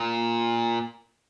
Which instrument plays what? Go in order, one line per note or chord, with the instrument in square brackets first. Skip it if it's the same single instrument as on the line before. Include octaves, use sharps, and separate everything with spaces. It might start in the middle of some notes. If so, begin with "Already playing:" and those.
Already playing: [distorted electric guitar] A#2